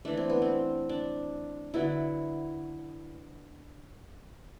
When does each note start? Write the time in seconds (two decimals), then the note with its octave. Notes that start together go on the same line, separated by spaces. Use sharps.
0.05 E3 A3 D4
0.17 C4
0.30 B3
0.42 C4
0.89 D4
1.74 D3 F#3 B3 E4